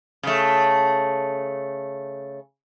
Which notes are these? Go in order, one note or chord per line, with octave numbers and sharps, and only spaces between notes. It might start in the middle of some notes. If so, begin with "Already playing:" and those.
C#3 A3